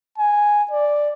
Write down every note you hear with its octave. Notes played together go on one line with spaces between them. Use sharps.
G#5
D5